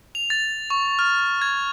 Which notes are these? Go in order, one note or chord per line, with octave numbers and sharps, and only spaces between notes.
F7
A6
C#6
F6
G#6